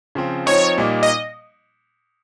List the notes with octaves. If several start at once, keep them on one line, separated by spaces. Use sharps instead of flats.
C#3 F3 C4
F3 C4 D#4 C#5
A#2 G3 A#3 D#4
D#5